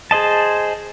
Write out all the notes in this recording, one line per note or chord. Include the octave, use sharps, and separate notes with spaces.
G#4 C5 D#5 A5